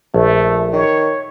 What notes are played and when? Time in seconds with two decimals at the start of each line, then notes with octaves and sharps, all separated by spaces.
0.14 A#1 A3
0.73 D#3 C#5